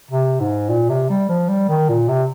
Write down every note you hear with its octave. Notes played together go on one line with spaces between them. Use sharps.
C3
G#2
A#2
C3
G3
F3
G3
D#3
A#2
C3